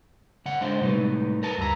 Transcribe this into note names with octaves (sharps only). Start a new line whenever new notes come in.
C#3 F#5
G#3 D4 C5 F5 C6
A2 C3 G3 G#3 D#4 B4
A#4 B4 A5
D2 G2 A#5 B5 E6